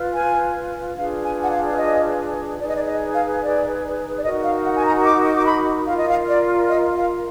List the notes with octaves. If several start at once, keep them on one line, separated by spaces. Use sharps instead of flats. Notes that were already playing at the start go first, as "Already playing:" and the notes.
Already playing: F4 B4
G#5
D4 F4 G#4 B4 F5
G#5
F#5
F5
D5
D#5
D#4 G#4 B4 D5
D#5
D5
D#5
F5
D5
D5
D#4 F#4 A#4 D#5
F5
F#5
G#5
A#5
D6
D6
B5
F4 A#4 F5
D#5
F5
D5
D#5
F5